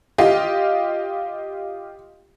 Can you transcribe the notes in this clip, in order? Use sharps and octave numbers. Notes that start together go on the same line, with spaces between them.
F4 G4 D#5 F5